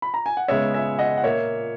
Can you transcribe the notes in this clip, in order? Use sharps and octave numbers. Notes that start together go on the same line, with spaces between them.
B5
A#5
G#5
F#5
C#3 G#3 B3 C#5 E5
E5 G#5
D#5 F#5
F#5
A#2 A#3 C#5 E5